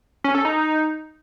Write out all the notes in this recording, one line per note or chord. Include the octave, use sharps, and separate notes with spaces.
C#4
A4
D#4